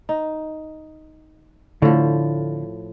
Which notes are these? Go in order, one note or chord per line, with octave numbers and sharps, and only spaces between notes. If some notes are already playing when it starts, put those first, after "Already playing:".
D#4
A2 D3 F3